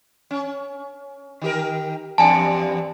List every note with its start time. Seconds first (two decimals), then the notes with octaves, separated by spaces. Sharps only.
0.31 C#4
1.41 D#3 G4 A#4
2.18 E2 G2 D5 G#5 A5